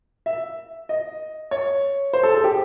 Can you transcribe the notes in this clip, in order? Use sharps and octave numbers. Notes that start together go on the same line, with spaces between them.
E5
D#5
C#5
C5
A4
G#4
G4